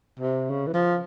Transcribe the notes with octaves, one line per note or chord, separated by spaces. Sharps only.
C3
C#3
E3
F3